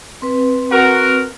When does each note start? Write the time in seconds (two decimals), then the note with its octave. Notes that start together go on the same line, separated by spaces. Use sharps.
0.22 C4 B4
0.72 F#4 A#4